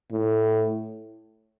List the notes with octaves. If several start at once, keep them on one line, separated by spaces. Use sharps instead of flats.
A2